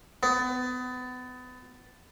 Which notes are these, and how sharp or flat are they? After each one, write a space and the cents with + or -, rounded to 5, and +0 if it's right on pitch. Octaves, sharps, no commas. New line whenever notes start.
B3 +30